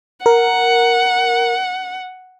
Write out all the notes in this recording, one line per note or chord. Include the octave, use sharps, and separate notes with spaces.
A#4 F#5